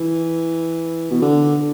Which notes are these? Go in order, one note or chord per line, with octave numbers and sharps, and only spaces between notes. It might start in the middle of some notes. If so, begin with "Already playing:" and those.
Already playing: E3
B2
D3